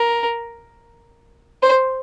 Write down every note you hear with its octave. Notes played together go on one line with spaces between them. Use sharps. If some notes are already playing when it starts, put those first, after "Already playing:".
Already playing: A#4
C5